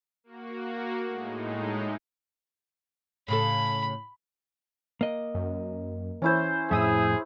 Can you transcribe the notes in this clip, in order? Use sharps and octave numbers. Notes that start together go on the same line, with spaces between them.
A#3 F#4
A2 G#3 D#4
A2 C#3 A4 B5
A#3 D#5
F#2
E3 C#4 E4 C5
F2 A2 G#4 E5 D#6 E6